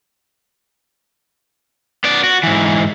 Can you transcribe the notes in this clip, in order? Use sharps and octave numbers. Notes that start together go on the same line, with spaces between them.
B3 D5
F#4
G#2 E3